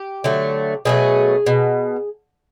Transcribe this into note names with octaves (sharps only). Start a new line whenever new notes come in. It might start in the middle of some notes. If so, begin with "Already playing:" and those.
Already playing: G4
D3 F#3 A3
B2 F#3 A3 G#4
B2